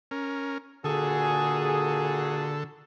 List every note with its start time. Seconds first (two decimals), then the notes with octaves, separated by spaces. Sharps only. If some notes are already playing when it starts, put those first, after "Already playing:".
0.11 C#4 A#4
0.84 A#2 D3 F#4 G#4 A4